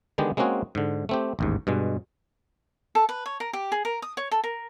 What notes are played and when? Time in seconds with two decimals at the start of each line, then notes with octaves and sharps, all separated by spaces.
0.18 D3 D#3 G#3 B3 G4
0.37 G#3 A#3 C4 C#4 F#4 G#4
0.75 G#2 D3
1.09 A3 C4 G4
1.39 A1 D#2 G#2
1.67 G2 B2 G#3
2.95 A4
3.09 B4
3.26 C#5
3.40 A#4
3.53 G4
3.72 G#4
3.85 A#4
4.02 D#6
4.17 C#5
4.31 A4
4.44 A#4